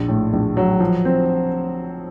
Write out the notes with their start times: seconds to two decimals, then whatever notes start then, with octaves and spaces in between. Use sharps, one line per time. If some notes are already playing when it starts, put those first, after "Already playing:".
Already playing: A#1
0.08 A2
0.33 A#1
0.57 F#3
0.80 F3
1.05 C4